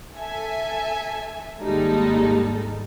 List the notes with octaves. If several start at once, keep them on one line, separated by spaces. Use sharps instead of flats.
A4 E5 G#5
G#1 D#2 G3 G#3 D#4 A4